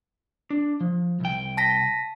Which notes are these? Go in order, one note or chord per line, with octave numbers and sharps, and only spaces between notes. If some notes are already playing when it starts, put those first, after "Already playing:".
D4
F3
C2 G5
A5 A#6 B6